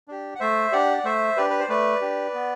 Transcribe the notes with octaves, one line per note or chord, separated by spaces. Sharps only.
D4 G4
F#5
A3 C5 E5
D4 G4 D5 F#5
D5
A3 C5 E5
D4 G4 B4 D5
B4
C5
A3 B4 D5
D4 G4
B3